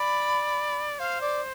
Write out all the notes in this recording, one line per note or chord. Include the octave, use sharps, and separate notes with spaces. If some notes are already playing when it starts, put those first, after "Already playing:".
Already playing: D5 B5
C5 F5
D5